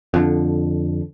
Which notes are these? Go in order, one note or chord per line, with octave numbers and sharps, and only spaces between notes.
F2 D3